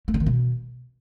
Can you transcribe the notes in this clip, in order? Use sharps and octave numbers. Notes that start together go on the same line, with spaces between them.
A3
D3
D#3
B2